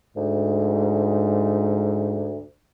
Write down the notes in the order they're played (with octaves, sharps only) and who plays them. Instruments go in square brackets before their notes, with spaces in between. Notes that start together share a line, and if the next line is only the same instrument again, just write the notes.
[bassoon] D2 [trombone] G#2